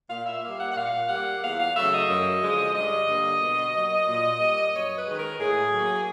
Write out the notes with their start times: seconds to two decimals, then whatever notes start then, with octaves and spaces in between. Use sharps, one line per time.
0.09 A#2 F5
0.26 E5
0.42 G3 A#3 F5
0.59 F#5
0.72 F#5
0.76 A#2 F5
1.08 G3 A#3 F#5
1.42 E2 F5
1.59 F5
1.74 C#3 F#3 A3 E5
1.91 D#5
2.08 F#2
2.41 D3 F3 G#3
2.74 G2 D#5
3.07 D3 G3 A#3
3.40 B2
3.74 F#3 A#3
4.07 A#2
4.40 G3 A#3
4.73 F#2 C#5
4.95 B4
5.06 D#3 G#3
5.18 A#4
5.39 A2 G#4
5.72 F#3
5.77 A#3